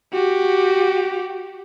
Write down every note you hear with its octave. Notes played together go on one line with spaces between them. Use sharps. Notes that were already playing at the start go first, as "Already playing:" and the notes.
F#4 G4